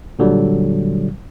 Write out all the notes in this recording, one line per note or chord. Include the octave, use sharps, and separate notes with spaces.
A#2 D3 F#3 G3